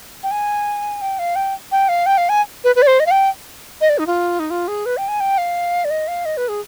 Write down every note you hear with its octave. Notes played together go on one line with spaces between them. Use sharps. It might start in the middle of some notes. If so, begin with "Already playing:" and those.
G5
G#5
G5
F5
G5
G5
F5
G5
F5
G#5
B4
B4
D5
C5
D#5
F5
G5
D#5
D5
D#4
F4
D#4
F4
G#4
B4
G5
G#5
G5
F5
D5
D#5
F5
D#5
B4
G#4